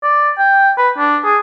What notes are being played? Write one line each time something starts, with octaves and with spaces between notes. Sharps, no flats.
D5
G5
B4
D4
G#4